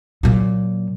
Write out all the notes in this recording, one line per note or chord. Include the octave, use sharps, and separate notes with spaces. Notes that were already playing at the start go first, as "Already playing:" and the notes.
A#2 F#3